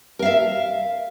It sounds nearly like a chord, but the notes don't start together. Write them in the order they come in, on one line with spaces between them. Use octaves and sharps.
A#4 F5 E5